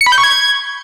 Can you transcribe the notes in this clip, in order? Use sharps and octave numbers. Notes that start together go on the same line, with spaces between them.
C#7
B5
G6
C#6
G#6